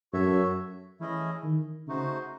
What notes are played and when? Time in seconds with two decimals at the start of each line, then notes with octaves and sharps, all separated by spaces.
0.13 F#2 F#4 A4 C#5 E5
1.00 E3 A3 C#4 E4 G#4 D#5
1.44 D#3
1.87 C#3 A3 D#4 F#4 C5